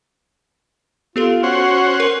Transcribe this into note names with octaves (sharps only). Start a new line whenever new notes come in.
B3 F4 G4 A4
C#4 F#4 C5 F#5
C#7
A#4